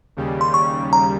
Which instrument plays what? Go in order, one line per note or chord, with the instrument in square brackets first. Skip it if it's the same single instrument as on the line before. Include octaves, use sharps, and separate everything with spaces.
[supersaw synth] D#2 C#3 G3
[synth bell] C6
C#6
A#5